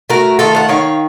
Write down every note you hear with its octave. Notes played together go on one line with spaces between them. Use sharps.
A3 F#4 A#4
D#3 F4 A4
F#5
D#3 C#5 F5